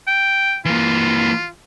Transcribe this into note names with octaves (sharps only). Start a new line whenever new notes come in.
G5
E3 A#3 F4